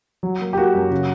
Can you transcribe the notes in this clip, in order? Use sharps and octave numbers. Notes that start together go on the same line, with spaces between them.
F#3
A#3
G4
A#3 F#4
F#2
C#3